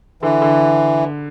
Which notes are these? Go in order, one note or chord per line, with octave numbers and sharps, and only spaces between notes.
D3 E3
D3